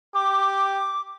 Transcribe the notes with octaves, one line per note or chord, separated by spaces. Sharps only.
G4 D6